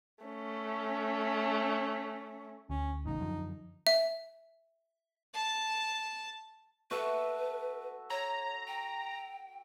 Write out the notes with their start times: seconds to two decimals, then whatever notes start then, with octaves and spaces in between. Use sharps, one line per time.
0.24 A3 C#4
2.70 D2 C#4
3.06 A1 A2 C#3 D#4
3.20 F#2 D3 F3
3.87 E5
5.34 A5
6.91 F#4 A4 B4 E5
8.10 C#5 A#5
8.67 G5